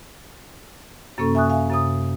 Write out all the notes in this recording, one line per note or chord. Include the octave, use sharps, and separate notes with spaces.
F#2 C3 A#3 C#4 A4 C#6
E5 G#5 C#6 D#6 F#6
E5 F5 G#5
F#2 C3 D#6